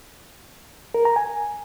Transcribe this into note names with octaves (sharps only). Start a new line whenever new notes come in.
A#4
A#5
G#5